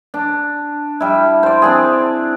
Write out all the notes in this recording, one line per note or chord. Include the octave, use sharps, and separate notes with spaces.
D4
G3 E4
C5 D5
C4 D4 G#4